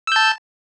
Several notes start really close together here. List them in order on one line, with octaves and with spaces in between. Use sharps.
E6 G6 A5